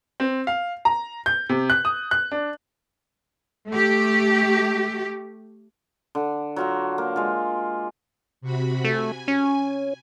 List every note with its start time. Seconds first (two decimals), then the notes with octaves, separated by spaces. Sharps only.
0.20 C4
0.47 F5
0.85 A#5
1.26 G6
1.49 C3
1.70 F#6
1.85 D#6
2.11 F#6
2.32 D4
3.69 A3 G4
6.15 D3
6.56 F#3 F4 A#5
6.98 A#3
7.16 G#3 F4
8.41 C3 F#4 B5
8.85 A3 G#5
9.28 C#4